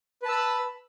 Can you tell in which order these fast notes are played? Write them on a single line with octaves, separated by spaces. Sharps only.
B4 A5 E6 B5